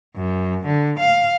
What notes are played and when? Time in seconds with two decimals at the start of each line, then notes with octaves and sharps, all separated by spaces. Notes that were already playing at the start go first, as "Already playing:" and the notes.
0.16 F#2
0.67 D3
0.99 F5